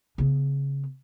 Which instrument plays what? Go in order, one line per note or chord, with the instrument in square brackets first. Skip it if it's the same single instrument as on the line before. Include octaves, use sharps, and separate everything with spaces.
[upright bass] C#3 B3